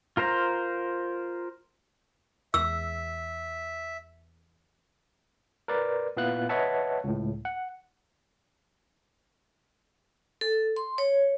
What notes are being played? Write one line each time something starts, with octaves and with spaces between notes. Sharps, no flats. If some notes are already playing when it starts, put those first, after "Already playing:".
F4 A#4 C5 A#5
E2 E5 E6
A#4 B4 D5
A#2 B3 E4 F5 F#6
B4 C#5 D#5 E5 F#5 A5
C#2 A2
F#5
A4
C6
C#5